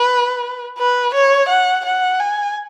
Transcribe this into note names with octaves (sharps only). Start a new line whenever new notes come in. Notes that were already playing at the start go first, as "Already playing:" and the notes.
Already playing: B4
B4
C#5
F#5
F#5
G#5